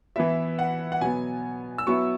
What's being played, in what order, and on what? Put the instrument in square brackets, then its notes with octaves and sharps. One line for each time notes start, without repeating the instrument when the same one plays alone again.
[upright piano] E3 B3 E4 E5
F#5
F#5
B2 F#3 B3 G#5
E6
F#3 B3 E4 C#6